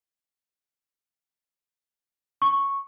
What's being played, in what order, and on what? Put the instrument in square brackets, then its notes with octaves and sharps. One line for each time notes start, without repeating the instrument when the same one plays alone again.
[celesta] C#6